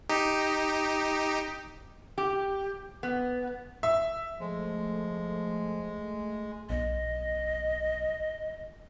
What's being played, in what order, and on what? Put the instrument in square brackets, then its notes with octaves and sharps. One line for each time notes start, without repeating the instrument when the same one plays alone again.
[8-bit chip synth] D#4 G4
[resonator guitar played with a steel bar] G4
B3
[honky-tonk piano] E5
[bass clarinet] F3 [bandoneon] G#3 [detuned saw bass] A3
[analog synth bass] B1 [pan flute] D#5